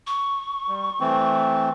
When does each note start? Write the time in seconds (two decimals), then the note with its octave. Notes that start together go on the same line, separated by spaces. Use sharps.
0.07 C#6
0.68 G3
1.00 E3 A3 C4